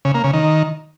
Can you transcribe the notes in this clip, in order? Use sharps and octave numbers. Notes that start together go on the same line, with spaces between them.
C#3
A#3
C#3
D#3